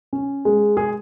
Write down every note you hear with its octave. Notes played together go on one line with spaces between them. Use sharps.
C#4
G#3
G#4